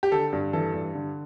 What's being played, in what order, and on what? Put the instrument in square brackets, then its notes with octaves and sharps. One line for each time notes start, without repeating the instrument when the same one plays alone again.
[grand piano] G4
D3 A4
G2
E3 A4
G2
D3